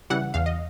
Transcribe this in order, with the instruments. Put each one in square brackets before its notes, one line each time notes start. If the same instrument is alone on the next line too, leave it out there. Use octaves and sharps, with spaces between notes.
[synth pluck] C#3 E3 G3 F#5
E2 F5
D#5